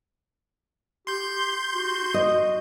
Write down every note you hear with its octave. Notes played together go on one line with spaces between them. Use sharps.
G4 C6 G6
F#4
D#5